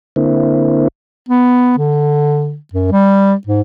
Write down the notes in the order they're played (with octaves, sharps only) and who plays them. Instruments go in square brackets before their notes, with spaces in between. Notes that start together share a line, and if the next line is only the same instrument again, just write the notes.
[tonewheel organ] D3 A#3 C4 E4
[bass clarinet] B3
D3
F#2
G3
G#2